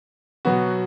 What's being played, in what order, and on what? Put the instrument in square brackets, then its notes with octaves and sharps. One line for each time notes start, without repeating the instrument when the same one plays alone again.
[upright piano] B2 F#3 B3 F#4